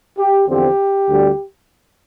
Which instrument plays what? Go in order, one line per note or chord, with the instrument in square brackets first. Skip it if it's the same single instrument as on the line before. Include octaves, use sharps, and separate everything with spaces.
[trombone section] G4
E2 D3 F3 C4 G4
D2 D3 G3